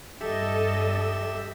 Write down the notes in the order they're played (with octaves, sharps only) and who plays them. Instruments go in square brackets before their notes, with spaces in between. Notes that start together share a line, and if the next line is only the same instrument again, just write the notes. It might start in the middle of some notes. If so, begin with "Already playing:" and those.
[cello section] G2 [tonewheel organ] G4 E5 [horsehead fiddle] A4 D#5